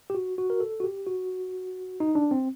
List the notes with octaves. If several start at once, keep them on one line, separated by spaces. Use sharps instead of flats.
G4
F#4
F#4
A#4
A4
F#4
G4
F#4
D#4
D4
C4